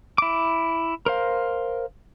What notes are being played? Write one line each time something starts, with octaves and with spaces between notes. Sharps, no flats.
E4 D6
A#4 C5 F5